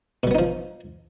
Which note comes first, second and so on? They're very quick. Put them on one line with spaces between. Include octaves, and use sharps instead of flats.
B2 G3 B3 D#4 F3